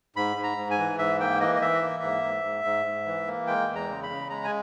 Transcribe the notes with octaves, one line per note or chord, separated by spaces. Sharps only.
G#2 B5
G#2
A#5
G#2
G#5
E3
G#2 E5
A#3 G5
E3 D#5
D#5
E3 E5
A#3
G#2
G#2
G#2
G#2
G#2
E3
A#3
G#3 G5
E2
A#5
C#3
B5
C#3
G#3 A#5
G#5